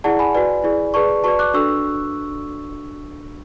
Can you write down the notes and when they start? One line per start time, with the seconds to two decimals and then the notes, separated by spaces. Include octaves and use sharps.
0.04 E4 G#4 D5 F#5 A5
0.19 G#5 B5
0.35 F#4 B4 D5
0.64 E4 G#4 D5
0.94 G#4 B4 D5 A5 C#6
1.24 F#4 B4 D5 A5 C#6
1.39 D6 F#6
1.54 D4 F#4 A4 C#6 E6